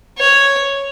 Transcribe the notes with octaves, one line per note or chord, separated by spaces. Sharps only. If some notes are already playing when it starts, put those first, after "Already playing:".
C#5